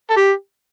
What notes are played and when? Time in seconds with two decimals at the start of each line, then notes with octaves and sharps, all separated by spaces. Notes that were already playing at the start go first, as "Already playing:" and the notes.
0.10 A4
0.16 G4